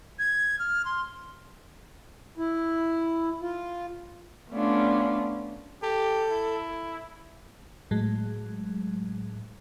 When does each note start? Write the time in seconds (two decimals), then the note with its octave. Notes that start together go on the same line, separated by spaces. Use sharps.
0.19 G#6
0.59 F6
0.85 C6
2.38 E4
3.42 F4
4.51 A3 B3 C#4 D4 F4
5.83 G4 A4
6.30 E4
7.91 A2 F#3 G#3